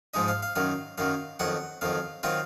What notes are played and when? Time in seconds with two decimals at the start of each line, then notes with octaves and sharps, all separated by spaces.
0.14 G#2 F3 G#3 D#4 D#5
0.28 F5
0.43 F5
0.55 F#2 D#3 F#3 F5
0.98 F#2 D#3 F#3 F5
1.39 F2 D#3 F#3 F#5
1.81 F2 D#3 F#3 F5
2.23 D#3 F#3 C4 F4 F5